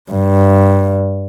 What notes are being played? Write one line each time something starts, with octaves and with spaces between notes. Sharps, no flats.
G2